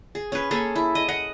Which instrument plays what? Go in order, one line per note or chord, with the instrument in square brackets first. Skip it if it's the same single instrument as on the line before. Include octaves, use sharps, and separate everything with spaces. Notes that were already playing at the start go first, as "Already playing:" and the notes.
[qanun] G#4
C#4 B4
A#3 C#4 G#4 A4
E4
D#5
D#5 F#5